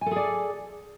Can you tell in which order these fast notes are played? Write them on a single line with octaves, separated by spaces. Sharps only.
G#5 A4 G#4 D5